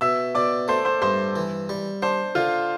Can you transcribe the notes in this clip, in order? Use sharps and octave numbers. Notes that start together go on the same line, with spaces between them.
B2 E5 E6
B2 D5 D6
A3 C5 C6
C5 C6
G2 C5 C6
E3
G3
D4 C5 C6
D3 F4 F5